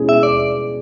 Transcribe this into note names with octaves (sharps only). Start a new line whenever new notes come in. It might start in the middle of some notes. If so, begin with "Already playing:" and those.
Already playing: B2 G#3 C#4 E4 G#4
E5
D5